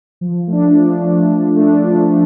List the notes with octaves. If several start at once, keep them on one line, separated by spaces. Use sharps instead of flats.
F3
A3 D4
F3
A3 D4
F3
A3 D4
F3
A3 D4